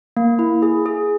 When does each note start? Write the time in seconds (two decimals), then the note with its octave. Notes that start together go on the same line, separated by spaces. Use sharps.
0.17 A#3
0.39 E4
0.62 G#4
0.86 G#4